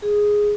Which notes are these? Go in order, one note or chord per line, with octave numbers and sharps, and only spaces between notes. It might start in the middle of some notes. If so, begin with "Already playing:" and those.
G#4